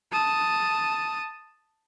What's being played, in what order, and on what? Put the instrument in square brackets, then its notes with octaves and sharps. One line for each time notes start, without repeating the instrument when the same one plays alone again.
[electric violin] A5 D#6